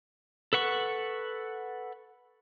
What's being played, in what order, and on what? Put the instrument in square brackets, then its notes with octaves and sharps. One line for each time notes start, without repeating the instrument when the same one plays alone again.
[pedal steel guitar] A4 B4 F#5 C#6